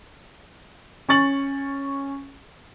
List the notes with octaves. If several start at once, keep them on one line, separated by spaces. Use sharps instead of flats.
C#4 C#6 A6 F#7